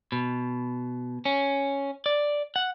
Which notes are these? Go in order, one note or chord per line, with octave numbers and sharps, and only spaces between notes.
B2
C#4
D5
F#5